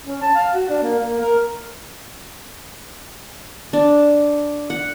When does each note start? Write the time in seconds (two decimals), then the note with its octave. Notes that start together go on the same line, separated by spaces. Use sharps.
0.06 C#4
0.21 A5
0.35 F5
0.54 F#4
0.69 D4
0.83 A#3
0.99 A#3
1.20 A#4
3.73 D4
4.70 F#5